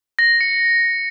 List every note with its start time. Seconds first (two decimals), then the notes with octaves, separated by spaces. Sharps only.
0.19 A#6
0.41 C#7